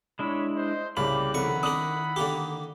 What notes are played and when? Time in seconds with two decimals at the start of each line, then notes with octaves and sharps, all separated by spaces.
0.19 G#3 D4 E4 C#5 B5
0.55 C5 D#5
0.97 C2 C#3 A#3 G4 D5 B5
1.34 F2 D#3 E4 F#5 B5 C#6
1.63 D4 A#4 D#6 F#7
2.16 D3 A#3 G4